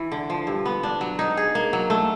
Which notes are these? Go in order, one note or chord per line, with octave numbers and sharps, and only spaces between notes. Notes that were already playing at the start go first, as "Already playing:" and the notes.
Already playing: E3
D3
F3
G2
B3
D4
F#3
D#4
G#4
A#3
F#3
A3